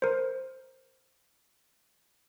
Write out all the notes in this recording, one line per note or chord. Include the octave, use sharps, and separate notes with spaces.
A#4 C5